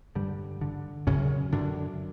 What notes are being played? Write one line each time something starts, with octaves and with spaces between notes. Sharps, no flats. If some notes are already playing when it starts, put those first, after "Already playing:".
G2 D3 G3
D3
F#2 C#3 C#4
F#2 D3 D4